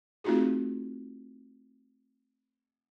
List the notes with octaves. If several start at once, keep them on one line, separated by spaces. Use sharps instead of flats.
A3 C4 D#4 F4 F#4 G#4